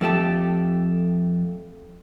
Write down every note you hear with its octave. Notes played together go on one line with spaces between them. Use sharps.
F2 A3 G4 A5